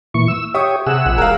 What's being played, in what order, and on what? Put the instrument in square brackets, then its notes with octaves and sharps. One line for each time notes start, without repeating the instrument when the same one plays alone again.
[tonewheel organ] A#2 E3 C#6
E6
[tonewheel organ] G4 C#5 [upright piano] E5 C#6 D#6
[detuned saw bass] C3 [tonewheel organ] G#4 F#5 E6
[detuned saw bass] A#1
[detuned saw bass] E1 [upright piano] A#4 F5